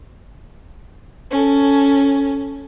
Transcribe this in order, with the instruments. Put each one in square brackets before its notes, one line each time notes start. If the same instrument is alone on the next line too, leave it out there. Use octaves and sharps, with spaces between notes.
[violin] C#4 A4